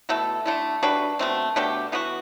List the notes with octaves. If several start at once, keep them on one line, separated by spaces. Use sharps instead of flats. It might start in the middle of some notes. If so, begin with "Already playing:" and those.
B2 A3 E4 A4
D3 A3 E4
G3 D4 F#4 B4
B2 A3 C4
B2 A3 D4 G4
E3 B3 F#4